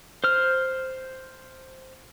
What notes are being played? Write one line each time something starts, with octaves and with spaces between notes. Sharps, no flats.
C5 F6